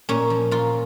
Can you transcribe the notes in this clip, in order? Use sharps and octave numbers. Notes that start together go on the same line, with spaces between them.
A#2 C#4
F3
A#2 F4